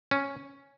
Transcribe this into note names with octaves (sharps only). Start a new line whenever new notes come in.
C#4